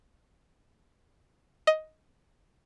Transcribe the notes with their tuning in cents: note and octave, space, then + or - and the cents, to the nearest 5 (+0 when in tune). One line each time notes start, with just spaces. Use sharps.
D#5 +10